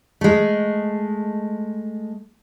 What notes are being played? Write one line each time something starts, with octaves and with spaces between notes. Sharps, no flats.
G#3 A3